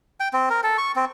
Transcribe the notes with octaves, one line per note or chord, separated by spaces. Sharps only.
G5
C4
A#4
A4
C#6
C4